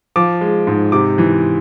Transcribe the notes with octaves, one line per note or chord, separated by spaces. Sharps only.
F3 D6
G#3
G#2
C3 D6
E3